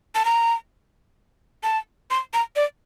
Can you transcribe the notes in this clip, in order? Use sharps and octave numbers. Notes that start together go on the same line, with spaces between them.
A5
A#5
A5
C6
A#5
D5